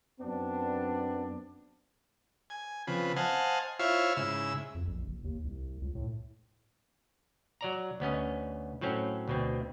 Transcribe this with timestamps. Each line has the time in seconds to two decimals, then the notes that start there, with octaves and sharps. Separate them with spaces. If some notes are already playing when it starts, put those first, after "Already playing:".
0.20 F#2 B3 C4 D4
2.50 G#5
2.87 C#3 F3 C4 B4
3.16 C5 D#5 F5 F#5 G#5 A5
3.79 E4 F4 C5 C#5 E5 F5
4.16 G#2 C#3 E4 E6
4.75 F2
4.87 A#1
5.06 F#1
5.24 D#2
5.44 C2
5.82 C#2
5.95 A2
7.61 F#3 D5 A#5
8.00 D2 B3 C#4 D#5
8.81 A2 F#3 C4 C#4
9.28 D2 B2 C4